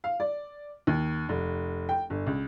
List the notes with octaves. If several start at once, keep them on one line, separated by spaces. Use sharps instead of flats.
F5
D5
D#2
F1
G5
G1
C#2